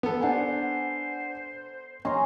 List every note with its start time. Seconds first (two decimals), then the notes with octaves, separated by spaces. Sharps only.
0.03 B3 A4
0.21 D4 C5 F#5 G#5
2.05 C#4 D#4 G#5 A#5 C6